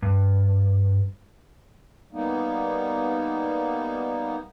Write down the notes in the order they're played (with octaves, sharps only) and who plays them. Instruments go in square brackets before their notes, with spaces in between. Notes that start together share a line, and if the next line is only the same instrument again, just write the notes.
[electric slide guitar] G2
[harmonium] G3 A#3 B3 D#4